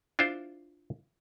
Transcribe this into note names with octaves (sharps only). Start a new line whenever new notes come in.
D4 E4 F4 C5